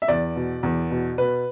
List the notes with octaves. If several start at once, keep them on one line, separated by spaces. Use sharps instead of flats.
E5
E2 D5
B2
E2
B2
B2 B4